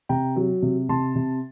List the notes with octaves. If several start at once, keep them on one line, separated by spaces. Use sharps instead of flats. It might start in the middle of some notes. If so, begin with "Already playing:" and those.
C3 G5 A#5
F#3
C3
C3 A5 C6
C3